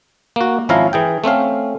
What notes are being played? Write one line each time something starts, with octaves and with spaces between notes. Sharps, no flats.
A#3 F#4
G#1 F3 C#4 E4 F5 A#5
E3 G#4 G5
A3 C4 C#4 F5